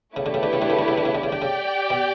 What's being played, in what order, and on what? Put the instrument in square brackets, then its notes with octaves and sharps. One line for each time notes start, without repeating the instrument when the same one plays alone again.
[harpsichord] C#3 [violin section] A3 E4 G4 B4
[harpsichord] D3
C#3
D3
C#3
D3
C#3
D3
C#3
D3
C#3
D3
C#3
[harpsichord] D3 [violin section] G4 D5 G5
[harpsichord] C#3
B2